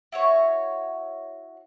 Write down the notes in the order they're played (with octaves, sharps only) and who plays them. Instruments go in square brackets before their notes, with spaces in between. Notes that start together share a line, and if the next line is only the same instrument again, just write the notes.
[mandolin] E4 F#4 C#5